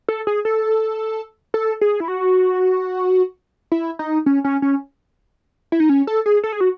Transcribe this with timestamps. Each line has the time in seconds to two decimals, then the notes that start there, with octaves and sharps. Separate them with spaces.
0.09 A4
0.27 G#4
0.45 A4
1.54 A4
1.81 G#4
2.00 E4
2.08 F#4
3.72 E4
3.99 D#4
4.26 C#4
4.44 C#4
4.62 C#4
5.72 E4
5.80 D#4
5.89 C#4
6.07 A4
6.26 G#4
6.43 A4
6.52 G#4
6.61 F#4